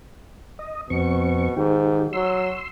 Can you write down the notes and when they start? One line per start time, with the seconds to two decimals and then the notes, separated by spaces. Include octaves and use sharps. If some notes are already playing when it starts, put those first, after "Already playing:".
0.59 D#5
0.90 F2 B2 C4 C#6
1.57 G#2 D#3 G4
2.13 F#3 C6 E6